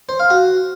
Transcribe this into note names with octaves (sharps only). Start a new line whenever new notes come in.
C5
F5
F#4